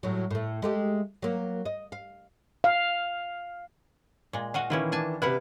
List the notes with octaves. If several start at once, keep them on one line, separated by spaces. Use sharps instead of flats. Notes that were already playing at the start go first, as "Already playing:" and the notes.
A2 F#3
A2 A3
G#3 A3 G4
F#3 A#3
D#5
F5
F5
A#2 G#3
F#4 D#5 F5 F#5
D#3 E3 C#4 E4 F4
D4 G#5 A5
C3 E4 B4 F5 F#5